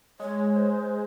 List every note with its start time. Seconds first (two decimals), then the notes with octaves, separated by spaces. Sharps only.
0.20 G#3 C#5
0.56 C5